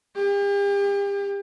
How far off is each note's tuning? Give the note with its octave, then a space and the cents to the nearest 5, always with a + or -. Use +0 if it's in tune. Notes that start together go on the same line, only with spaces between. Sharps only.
G4 +40